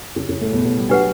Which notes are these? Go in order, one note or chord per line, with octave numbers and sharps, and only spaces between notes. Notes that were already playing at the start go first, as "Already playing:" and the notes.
C#3
C#3
A2 A3
B2 B3
B2 B3
G3
F#3 D4 G4 B4 F#5